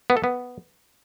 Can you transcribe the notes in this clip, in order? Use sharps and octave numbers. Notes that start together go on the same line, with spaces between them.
B3
A4
B3